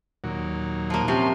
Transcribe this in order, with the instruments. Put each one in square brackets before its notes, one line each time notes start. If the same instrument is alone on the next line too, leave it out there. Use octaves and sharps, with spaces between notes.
[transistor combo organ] D#2 A#2 F#3
[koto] F3 A#3
[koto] C3 F3 [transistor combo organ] C#4 F4 C6